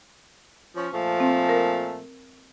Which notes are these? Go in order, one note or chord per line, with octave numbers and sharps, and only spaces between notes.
F3 C#4
A#2 F3 A3
C4
A#4